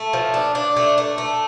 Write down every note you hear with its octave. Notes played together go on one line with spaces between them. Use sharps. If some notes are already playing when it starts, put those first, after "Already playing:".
Already playing: A3
F3
D4
D4
A3
A3
A3